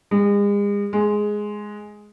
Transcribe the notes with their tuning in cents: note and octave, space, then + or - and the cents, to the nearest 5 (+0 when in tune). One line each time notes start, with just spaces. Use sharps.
G#3 -40
G#3 +5